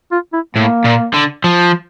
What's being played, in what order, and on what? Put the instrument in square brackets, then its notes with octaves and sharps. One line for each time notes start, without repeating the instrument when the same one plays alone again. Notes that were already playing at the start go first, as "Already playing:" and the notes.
[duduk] F4
E4
[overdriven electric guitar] A2 [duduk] A#3
[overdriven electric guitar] A#2
D3
F3